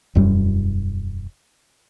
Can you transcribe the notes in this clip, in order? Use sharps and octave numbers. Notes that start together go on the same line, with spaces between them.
E1 F#2 G3